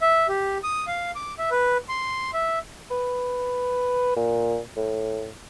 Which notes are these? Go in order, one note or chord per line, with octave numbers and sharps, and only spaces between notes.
E5
G4
D#6
F5
D6
E5
B4
C6
E5
B4
A#2
A2